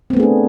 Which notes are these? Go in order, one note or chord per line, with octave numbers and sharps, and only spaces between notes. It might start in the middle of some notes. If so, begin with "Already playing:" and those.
A3 B3 C4 D4 G#4